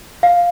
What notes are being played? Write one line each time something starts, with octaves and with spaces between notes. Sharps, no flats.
F5